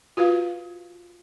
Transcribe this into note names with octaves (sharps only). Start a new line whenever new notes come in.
F4 F#4 B4 F5